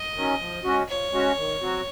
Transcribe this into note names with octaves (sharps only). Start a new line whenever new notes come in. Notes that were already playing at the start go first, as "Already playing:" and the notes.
Already playing: D#5
D#3 F#3 C#4
F3
G#3 C#4 F#4
F3 C#5
G#3 C#4 F#4
D#3
F#3 C4 F#4